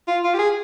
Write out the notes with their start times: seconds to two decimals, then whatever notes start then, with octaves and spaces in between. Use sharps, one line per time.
0.08 F4
0.24 F4
0.34 G4
0.39 G#4